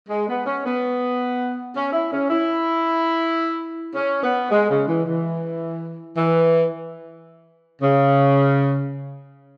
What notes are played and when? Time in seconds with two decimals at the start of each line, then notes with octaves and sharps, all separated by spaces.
0.09 G#3
0.29 B3
0.46 C#4
0.66 B3
1.75 C#4
1.93 E4
2.12 C#4
2.30 E4
3.95 C#4
4.24 B3
4.51 G#3
4.70 C#3
4.88 E3
5.07 E3
6.17 E3
7.82 C#3